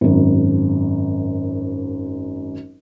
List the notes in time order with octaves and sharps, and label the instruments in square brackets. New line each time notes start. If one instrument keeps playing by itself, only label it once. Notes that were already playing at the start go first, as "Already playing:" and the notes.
[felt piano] G#1 F#2